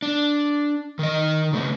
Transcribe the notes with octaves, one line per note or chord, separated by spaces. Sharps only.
D4
D#3 D#5
C#3 A3